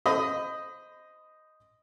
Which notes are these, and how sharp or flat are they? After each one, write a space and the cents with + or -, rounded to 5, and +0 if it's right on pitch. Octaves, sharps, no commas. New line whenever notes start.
C5 +0 D#5 +0 B5 +30